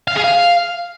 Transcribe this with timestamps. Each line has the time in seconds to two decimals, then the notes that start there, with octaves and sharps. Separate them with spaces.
0.08 F5
0.16 G#4
0.24 F5